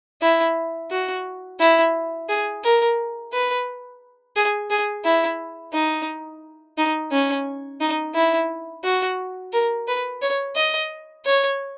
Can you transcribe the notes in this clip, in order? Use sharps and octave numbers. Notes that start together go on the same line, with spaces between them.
E4
F#4
E4
G#4
A#4
B4
G#4
G#4
E4
D#4
D#4
C#4
D#4
E4
F#4
A#4
B4
C#5
D#5
C#5